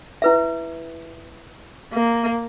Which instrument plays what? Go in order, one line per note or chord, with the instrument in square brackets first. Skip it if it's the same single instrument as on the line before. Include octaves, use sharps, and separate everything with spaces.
[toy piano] E4 B4 E5
[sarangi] A#3